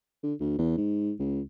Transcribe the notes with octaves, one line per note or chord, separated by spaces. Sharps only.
D3
D2
E2
G#2
C#2